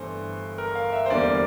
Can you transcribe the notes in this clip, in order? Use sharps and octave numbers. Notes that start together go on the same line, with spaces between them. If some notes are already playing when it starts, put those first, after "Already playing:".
Already playing: G1 G2 E3 A3 C5
A#4
F5
E5
C5
E2 D3 G3 A#3 D5